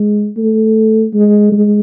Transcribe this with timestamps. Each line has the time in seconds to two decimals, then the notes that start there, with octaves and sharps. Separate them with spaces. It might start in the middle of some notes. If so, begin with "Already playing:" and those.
Already playing: G#3
0.37 A3
1.14 G#3
1.52 G#3